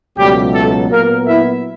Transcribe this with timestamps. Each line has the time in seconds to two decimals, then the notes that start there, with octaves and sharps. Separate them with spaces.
0.18 C#2 B2 F#3 G3 A3 G4
0.54 A3 A4
0.91 A#2 F#3 A#3 B3 A#4
1.27 E4 E5